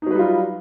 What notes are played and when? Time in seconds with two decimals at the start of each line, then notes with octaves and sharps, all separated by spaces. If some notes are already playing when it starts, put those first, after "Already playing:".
0.02 D#4
0.06 F#3
0.11 B4
0.15 G3
0.19 F4